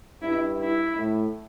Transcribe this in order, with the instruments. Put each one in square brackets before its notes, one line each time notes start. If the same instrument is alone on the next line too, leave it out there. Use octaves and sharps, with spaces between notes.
[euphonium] G2 [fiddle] E4
[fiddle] E4
[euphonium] A2